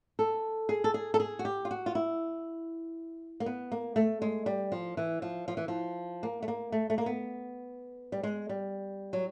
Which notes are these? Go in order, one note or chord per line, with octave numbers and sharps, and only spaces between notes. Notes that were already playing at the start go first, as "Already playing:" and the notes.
A4
G#4
A4
G#4
A4
G#4
F#4
G4
F4
F#4
F4
E4
A#3
B3
A#3
A3
G#3
G3
F3
E3
F3
F3
E3
F3
A#3
A3
A#3
A3
A3
A#3
B3
G3
G#3
G3
F#3